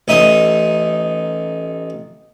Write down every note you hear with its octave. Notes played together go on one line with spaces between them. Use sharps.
A1 D#4 E5 D#6